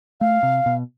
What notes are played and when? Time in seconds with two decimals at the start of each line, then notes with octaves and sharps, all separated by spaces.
0.21 A3 F5
0.43 C3
0.66 B2